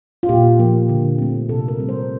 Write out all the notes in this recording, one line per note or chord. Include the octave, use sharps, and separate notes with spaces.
F4
A#2 G4
F3 A#3
D3
A3 C4
C3 A4
A#4
G3 C4
C5